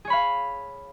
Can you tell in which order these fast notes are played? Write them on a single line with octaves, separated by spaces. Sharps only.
G#4 C#5 B5 F5